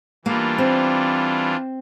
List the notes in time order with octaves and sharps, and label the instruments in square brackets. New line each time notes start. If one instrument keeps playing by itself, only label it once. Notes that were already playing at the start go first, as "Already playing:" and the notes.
[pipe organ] E3 G3 D4 F4 [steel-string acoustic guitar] A#3
[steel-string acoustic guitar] C4